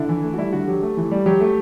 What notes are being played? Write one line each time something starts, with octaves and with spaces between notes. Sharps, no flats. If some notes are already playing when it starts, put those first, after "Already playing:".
Already playing: D3 E4
E3
A3
F#4
G3 E4
D3 F#4
F#3 G4
A3
E3
G3
F#3 G4
A3